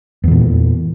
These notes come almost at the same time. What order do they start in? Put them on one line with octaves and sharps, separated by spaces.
E2 E3 A#2